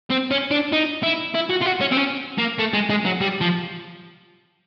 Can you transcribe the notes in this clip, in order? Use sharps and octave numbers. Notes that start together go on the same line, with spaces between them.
C4
C#4
D4
D#4
E4
E4
F#4
F4
F#4
C#4
C4
C#4
A#3
A3
G#3
G#3
F#3
G3
F3